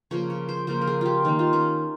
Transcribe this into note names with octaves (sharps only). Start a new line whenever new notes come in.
C#3 F3 A#3 C#5
C#5
C5
C#3 F3 A#3 C5
A#4
G#4
F4 G4
D#3 A#3 D#4
F4
C#4